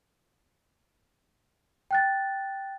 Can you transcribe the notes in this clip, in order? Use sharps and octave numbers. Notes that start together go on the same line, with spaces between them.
G5 F#6 A6